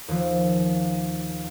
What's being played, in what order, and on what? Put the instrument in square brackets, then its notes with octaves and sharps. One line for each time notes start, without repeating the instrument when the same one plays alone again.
[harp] D#2 F3